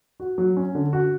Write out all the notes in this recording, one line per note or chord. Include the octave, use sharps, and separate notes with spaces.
F#4
F#3
C#4
D3
F#4